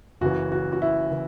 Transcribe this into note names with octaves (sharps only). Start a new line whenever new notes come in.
F#1 F#2 C#3 E3 F#4
F#4
F#4
E4
E3